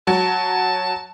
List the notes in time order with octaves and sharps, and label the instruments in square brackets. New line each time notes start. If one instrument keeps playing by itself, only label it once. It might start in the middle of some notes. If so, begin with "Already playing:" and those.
[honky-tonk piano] F#3 [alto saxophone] A5